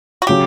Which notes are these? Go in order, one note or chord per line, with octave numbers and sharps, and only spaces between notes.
F#4
C#3 F#3 G4